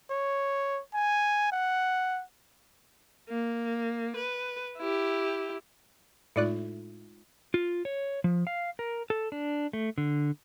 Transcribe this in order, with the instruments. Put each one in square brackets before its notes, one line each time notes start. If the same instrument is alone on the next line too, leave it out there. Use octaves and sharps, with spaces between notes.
[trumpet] C#5
G#5
F#5
[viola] A#3
B4
E4 G4
[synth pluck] A2 D5 F#6 [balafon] G#3 D#4 F4
[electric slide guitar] F4
C#5
F3
F5
A#4
A4
D4
A3
D3